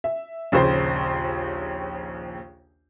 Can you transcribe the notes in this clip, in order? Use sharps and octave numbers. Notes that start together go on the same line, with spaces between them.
E5
A#1 D#2 C#3 C5 C6